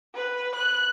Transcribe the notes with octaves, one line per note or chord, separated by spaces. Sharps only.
B4
F#6